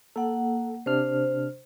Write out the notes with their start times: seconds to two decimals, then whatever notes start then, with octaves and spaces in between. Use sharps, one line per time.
0.16 A#3 A4 F#5
0.86 C3 D4 C5 F6